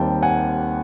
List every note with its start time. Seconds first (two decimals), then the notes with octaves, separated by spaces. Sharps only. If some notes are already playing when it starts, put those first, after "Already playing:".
Already playing: D#2 D#3 G3 C4 G5 A5
0.23 F#5 G#5